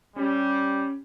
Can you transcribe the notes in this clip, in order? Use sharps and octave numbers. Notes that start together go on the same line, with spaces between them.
G3 C#4 G4